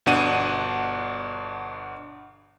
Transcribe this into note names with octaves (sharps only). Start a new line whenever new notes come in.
G1 B2 D4 F#5 D#7